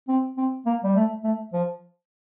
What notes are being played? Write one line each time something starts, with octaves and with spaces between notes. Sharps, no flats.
C4
C4
A#3
G3
A3
A3
F3